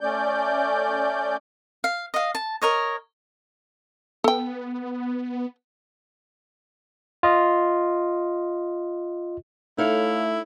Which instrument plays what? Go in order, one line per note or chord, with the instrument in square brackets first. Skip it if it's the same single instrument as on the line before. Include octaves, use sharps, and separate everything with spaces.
[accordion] A3 C#4 D5 G6
[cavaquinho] F5
D#5 F5
A5
A#4 C#5 D#5
[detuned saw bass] B3 [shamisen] A4 G5
[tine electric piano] F4 D#5
[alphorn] A3 [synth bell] D#4 A4 C#5 [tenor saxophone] E4 [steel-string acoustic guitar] F5